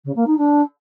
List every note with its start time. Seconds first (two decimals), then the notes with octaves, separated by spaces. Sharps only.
0.05 C#3
0.15 A#3
0.26 D#4
0.37 D4